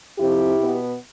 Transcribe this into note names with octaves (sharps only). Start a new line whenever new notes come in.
F2 C3 F3 C4 E4 G4
B2 B3